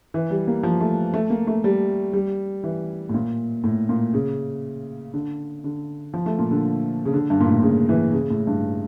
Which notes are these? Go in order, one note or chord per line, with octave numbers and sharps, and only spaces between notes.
E3
G3
A#3
F3
A3
A3
A#3
A3
G3
G3
E3
A2
A#2
A2
A#2
C#3
D3
D3
F3
A3
A#2
D3
C#3
D3
G2
A#2
A2
A#2
C#3
E3
C#3
A2
G2